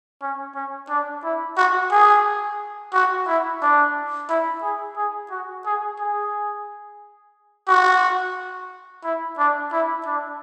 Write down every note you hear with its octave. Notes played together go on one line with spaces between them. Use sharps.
C#4
C#4
D4
E4
F#4
G#4
F#4
E4
D4
E4
G#4
G#4
F#4
G#4
G#4
F#4
E4
D4
E4
D4